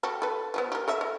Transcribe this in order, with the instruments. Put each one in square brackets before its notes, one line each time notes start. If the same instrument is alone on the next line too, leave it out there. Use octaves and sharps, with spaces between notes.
[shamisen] F#4 G4 A4
A4 B4
F3 G#3 B3
G4 A#4
A4 D#5 E5
A4